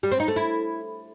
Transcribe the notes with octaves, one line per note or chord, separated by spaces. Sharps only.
G3
C4
D#4
A3
E4